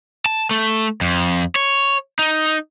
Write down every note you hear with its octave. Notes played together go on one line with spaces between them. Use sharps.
A5
A3
F2
C#5
D#4